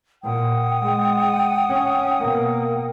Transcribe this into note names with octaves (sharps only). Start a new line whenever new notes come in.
A#2 F#5 G5 D#6
G#3
C#4
B2 A#3